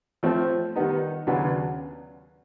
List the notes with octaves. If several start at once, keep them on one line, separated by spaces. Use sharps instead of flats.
F3 A3 C4 F4
D#3 G3 B3 D#4
D#2 C#3 F#3 B3 D4